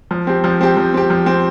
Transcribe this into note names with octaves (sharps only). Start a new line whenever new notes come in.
F3
C4 G4
F3
C4 G4
F3
C4 G4
F3
C4 G4